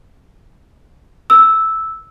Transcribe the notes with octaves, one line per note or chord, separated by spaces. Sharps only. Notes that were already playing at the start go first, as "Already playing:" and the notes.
E6